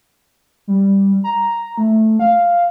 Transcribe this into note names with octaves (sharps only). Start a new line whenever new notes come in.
G3
A#5
A3
F5